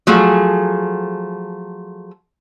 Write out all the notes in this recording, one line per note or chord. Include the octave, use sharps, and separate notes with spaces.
F3 F#3 A3 G#4